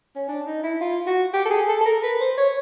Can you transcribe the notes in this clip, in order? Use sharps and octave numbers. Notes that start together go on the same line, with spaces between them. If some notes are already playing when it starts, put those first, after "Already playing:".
C#4
D4
D#4
E4
F4
F#4
G4
A4
G#4
A4
A4
A#4
B4
C5
C#5